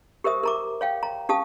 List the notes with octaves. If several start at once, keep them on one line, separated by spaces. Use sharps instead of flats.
G4 A#4 C5 E5 D#6
A#4 A#5 D6
C#5 F5 G5
A#5
C#4 G4 F5 A5 D#6